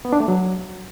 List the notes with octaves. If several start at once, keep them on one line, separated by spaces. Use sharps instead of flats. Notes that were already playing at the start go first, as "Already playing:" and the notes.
B3
D4
A3
F#3